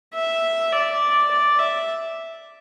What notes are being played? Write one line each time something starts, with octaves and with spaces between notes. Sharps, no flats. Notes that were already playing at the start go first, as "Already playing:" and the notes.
E5
D5
D5
E5